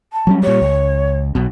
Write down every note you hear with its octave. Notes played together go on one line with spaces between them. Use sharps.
A5
F#3 G3 C#4
A#2 G3 C#5
C#2
B1 B2